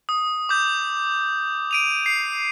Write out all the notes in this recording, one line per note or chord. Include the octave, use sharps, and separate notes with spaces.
D#6
D6 G6
D7 D#7 F7
C7